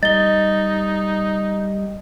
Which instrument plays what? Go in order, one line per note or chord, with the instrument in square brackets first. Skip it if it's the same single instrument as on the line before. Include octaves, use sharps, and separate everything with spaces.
[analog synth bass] G3 [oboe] D#4 [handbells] D#5 [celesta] A6 G7